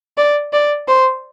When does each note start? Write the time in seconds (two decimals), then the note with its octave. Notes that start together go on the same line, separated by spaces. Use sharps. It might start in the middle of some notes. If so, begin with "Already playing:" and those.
0.17 D5
0.53 D5
0.88 C5